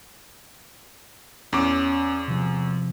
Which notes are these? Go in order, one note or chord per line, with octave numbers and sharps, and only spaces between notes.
E2 C#4 C#5 D6
C3 F3